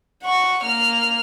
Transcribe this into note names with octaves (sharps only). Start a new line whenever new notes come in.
F#5 C#6
A#3 F6